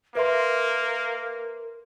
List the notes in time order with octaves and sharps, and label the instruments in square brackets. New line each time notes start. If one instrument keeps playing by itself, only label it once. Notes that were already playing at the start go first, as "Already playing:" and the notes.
[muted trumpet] A#3 [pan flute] A#4 [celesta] B4 E5 C6